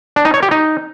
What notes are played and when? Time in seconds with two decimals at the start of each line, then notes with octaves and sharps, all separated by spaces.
0.16 D4
0.25 D#4
0.34 C#5
0.42 G4
0.51 D#4